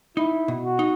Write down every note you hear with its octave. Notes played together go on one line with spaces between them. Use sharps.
D#4 E4
B2
F#4
D#4